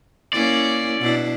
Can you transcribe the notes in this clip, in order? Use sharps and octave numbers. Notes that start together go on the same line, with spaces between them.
A#3 C#4 E4 D5
B2 D4 E4